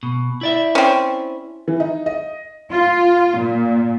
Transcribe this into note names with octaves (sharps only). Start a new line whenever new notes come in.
B2
E4 D5 E5
C4 C#4
E3
D#4
D#5
F4
A#2